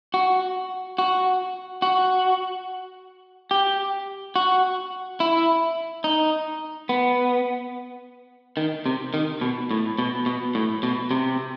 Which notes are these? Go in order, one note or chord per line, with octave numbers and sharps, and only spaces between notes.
F#4
F#4
F#4
G4
F#4
E4
D#4
B3
D#3
C3
D#3
B2
A2
B2
B2
A2
B2
C3